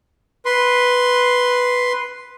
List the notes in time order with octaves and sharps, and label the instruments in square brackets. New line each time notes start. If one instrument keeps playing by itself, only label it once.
[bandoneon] B4 C6